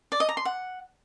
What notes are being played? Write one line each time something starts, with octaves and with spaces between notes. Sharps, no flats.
D5
D#5
A#5
C6
F#5